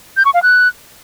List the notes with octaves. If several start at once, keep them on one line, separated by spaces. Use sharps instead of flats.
G6
C#6
F5
F#6